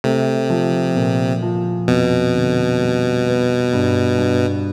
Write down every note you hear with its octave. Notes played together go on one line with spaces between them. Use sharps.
C3 A3
F3
A#2
F3
F2 B2
D3
G3
B3
G2
G2